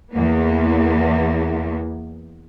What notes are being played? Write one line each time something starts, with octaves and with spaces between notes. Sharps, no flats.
E2 A#3 B3